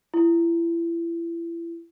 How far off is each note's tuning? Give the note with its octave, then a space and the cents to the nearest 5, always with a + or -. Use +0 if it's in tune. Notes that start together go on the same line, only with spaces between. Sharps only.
E4 +30